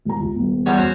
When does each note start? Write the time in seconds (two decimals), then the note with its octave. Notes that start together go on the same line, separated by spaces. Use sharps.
0.05 E1 A#5
0.20 C#2
0.35 D#1 B2
0.66 E2 G3 C#4 F#5
0.78 C#4 F#4 C5